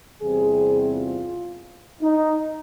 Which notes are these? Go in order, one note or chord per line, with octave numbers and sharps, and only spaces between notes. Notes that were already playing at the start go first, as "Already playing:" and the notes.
E2 C3 E3 G3 C4 G#4
F4
D#4